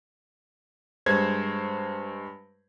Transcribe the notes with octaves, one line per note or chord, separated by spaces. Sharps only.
G2 G#3 C5 C#5 G#6